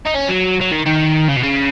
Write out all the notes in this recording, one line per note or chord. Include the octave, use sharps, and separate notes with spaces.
D#4
C#4
F#3
F#3
D#3
D#3
C#3
B2
C#3